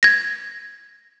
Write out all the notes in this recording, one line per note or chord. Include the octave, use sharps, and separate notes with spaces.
G#6 A#6